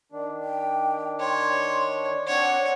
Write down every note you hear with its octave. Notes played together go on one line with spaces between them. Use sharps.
D#3 D4
G5
C#5 C6
C4 D4 C#5 F#5